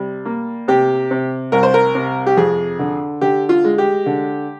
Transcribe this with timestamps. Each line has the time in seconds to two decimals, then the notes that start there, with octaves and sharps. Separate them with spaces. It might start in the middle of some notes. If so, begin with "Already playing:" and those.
Already playing: C3 G3
0.25 A#3
0.68 C3 G4
1.11 C3
1.52 C2 A#4
1.63 C5
1.74 A#4
1.95 C3
2.27 G4
2.37 F2 G#4
2.79 D3
3.21 D3 G4
3.49 F4
3.64 G#3
3.78 G4
4.06 D3